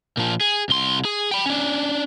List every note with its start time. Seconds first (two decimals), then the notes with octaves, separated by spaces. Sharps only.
0.17 A#2 F3
0.41 G#4
0.69 C2 C6
1.05 G#4
1.31 G5 B5
1.46 C#4 D4